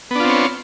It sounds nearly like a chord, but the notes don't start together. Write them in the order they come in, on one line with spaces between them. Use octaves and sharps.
B3 D4 F4 C4 C#5